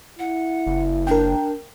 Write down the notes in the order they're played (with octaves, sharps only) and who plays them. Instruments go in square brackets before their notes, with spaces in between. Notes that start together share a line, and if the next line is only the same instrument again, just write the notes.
[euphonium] E4 [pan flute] F#5
[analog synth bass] F#1
[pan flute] D4 [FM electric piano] A#4 G5